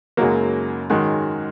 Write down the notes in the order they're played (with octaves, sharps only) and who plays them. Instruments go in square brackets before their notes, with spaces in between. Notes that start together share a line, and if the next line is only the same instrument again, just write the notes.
[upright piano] F#2 C#3 G#3 D#4 F#4 [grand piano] F#3 A#3
[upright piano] G#2 F#3 C#4 F#4 [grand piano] D#3 G#3